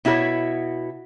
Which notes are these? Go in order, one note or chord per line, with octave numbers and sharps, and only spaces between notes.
B2 E4 F#4 A4 C#5